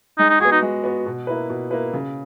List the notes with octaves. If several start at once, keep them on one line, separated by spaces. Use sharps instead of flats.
G#3 D#4
D#4
B3 F#4 G#4
D#4
G#3
B3 F#4
B2
A#3 E4 B4
B2
A#3 E4 B4
C#3